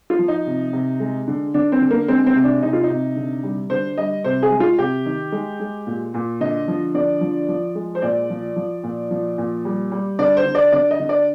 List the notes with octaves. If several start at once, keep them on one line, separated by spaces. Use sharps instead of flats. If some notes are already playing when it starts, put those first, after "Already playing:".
F4
F3
D#4
C3
C3
G#3
D3
D3 D4
C4
D3
A#3
G#3 C4
C4
C3
D4
C3 D#4
F4
D#4
C3
D3
G3
D3 C5
G3 D#5
C3 C5
G#4
G#3
F4
C3 G4
D#3
G#3
G#3
A#2
A#2
D3 D#5
F3
D3 D5
F3
F3
G#3
C5
A#2 D5
F3
F3
A#2
F3
A#2
G3
G3
D3 D5
C5
D3
D5
D3 D5
D#5
D3
D5